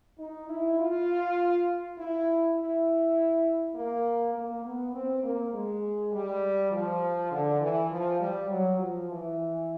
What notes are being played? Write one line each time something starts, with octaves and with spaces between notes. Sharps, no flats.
D#4
E4
F4
E4
E4
A#3
A#3
B3
C4
A#3
G#3
G3
F3
D3
E3
F3
G3
F#3
F3
E3